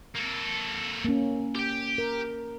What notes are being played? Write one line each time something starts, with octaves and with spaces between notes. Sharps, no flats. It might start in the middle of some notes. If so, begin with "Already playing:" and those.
A#3 A4
A#3 C#4
G4 G5
A#4